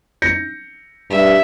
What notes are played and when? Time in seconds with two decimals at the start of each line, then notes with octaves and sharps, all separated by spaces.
0.22 G6 A#6 C#7
1.10 G2 E5